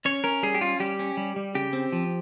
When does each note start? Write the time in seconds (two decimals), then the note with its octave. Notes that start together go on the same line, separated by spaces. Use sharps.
0.05 C#4 C#5
0.24 C#4 A#4
0.43 G3 G#4
0.55 G4
0.61 C#4 F4
0.80 G3 G4
0.99 C#4
1.17 G3
1.36 G3
1.55 C#3 G4
1.73 C4
1.92 F3